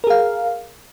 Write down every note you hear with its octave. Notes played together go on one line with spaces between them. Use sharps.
G#4 A#4 F5